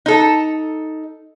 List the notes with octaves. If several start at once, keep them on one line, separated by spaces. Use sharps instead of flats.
D#4 A4